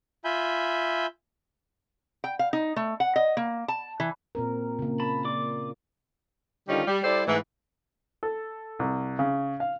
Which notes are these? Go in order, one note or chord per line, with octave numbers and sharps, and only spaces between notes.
F4 E5 G#5 B5 G6
G5
F5
D#4
A3
F#5
D#5
A#3
A5
E3
A#2 C4 A#4
C#3 A#3
A5 B5
F4 D5 D6
D3 D#3 G3 C#4 D#4 F4
G3
G3 E4 G4 A4 C5 D5
G#2 E3 A3
A4
C2
C#3
F5